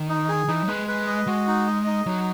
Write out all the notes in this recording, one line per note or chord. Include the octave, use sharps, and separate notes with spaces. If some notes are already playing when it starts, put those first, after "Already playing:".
Already playing: D#3
D#4
G#4
E3 D#4
F#3
G#3 B4
B4
D#5
G#3 F#4
D#4
D#5
D#4
F#3 D#4